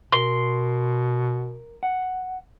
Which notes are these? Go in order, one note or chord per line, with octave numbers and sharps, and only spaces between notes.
B2 A#4 C6
F#5